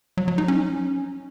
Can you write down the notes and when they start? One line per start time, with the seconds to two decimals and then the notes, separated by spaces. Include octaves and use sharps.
0.17 F#3
0.28 F#3
0.38 D#4
0.48 C#4